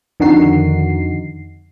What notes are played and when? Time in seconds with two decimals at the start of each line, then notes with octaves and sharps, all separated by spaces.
0.20 F2 D3 D#3 D#4 F#4 C7